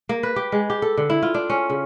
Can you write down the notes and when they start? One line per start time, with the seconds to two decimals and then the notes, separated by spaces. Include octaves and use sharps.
0.09 A#3
0.23 B4
0.36 G4
0.52 G#3
0.70 G4
0.82 A4
0.97 D3
1.10 E4
1.23 F4
1.34 D4
1.50 C#4
1.70 C#3